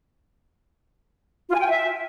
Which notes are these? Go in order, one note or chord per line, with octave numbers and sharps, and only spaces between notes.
F4
G#5
G5
G#5
E5